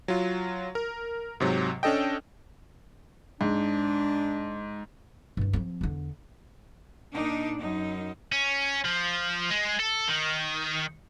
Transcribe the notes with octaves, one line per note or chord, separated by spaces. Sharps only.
F#3 F4
A#4
G#2 C3 F#3
C#4 D4 A4 D#5 G5
G#2 D4
G2 D#3
F3 C4
E2 D3
A#2 D4 D#4
F#2 D#4
C#4
F3
G#3
A4
D#3